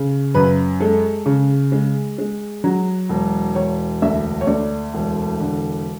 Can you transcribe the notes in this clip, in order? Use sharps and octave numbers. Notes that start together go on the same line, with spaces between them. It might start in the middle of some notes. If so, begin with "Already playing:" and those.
Already playing: C#3
F#2 B4
G#3 A4
C#3
G#3
G#3
F#3
E1
E1 C#5
D2 E5
C#5
D2 D5
E1
D3